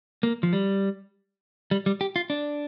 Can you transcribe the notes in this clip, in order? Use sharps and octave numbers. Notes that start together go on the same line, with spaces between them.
A#3
F3
G3
G3
G3
G4
F4
D4